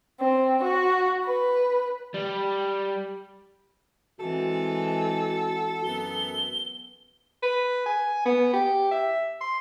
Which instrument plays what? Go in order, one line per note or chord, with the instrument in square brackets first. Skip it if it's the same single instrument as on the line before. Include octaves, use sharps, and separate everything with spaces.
[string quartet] C4
F#4
B4
[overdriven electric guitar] G3
[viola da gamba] E3 G#3 C4 [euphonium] F#4 [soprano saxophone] A4
[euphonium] F#2 [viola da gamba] B3 [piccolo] G7
[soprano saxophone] B4
G#5
B3
G4
E5
C6